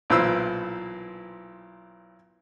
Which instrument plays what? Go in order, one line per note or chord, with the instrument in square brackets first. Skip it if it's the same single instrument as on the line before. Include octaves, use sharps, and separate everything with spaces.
[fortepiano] B1 A#2 E3 C5 B5 E6